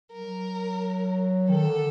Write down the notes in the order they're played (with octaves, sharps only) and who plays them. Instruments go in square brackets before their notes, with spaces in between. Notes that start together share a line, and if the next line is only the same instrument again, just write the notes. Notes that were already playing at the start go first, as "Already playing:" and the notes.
[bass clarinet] F#3 [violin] A#4
[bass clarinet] D#3 [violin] A4
[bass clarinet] D3